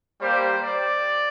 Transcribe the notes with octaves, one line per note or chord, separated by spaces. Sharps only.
G3 A#3 G4 C5
D5